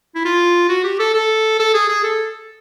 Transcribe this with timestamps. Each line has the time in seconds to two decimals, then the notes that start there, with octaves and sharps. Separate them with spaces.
0.15 E4
0.25 F4
0.69 F#4
0.84 G4
0.99 A4
1.14 A4
1.59 A4
1.74 G#4
1.89 G#4
2.04 A4